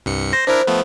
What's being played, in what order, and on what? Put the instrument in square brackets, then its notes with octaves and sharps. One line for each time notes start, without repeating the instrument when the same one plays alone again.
[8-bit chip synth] C2 G2 C#7
[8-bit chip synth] C5 [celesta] A#6
[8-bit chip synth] D4 E4 A#4 [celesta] C5
[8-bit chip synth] F3 A3 B3